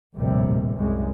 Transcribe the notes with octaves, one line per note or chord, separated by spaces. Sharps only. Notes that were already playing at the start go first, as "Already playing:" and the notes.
F1 A#1 D#2 A2 C3 G3
C2 F#2 G#3